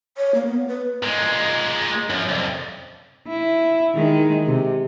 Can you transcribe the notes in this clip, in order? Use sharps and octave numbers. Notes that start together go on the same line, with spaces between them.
C#5
A#3
B3
B4
A#2 G#3
F#2 F3
C2 F2
E4
D#3 G#3
C3